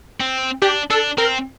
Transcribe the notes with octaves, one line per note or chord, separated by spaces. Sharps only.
C4
D4 G4
D4 A4
C4 A#4